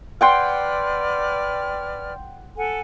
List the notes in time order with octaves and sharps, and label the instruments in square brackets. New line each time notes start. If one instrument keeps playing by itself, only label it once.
[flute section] B4 D5 F6 [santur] F#5 G5 C6
[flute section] A4 F#5 G#5